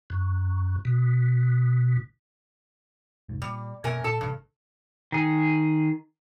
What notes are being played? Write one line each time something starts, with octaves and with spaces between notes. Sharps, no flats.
F#2
B2
F1 C2 G#2
A#2 G3
F#2 B2 A#3 C#4 A#4 G#5
A#2 A4 A5
A1 G2 C3
D#3 G#4